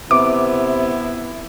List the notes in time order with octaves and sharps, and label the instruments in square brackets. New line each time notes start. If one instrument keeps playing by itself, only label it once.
[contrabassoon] C3 [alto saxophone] B3 [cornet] E4 [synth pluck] D6